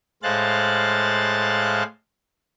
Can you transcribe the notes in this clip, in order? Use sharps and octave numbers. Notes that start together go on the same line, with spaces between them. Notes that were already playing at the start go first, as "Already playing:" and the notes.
A2 G#3 C5 F5 F#6 A6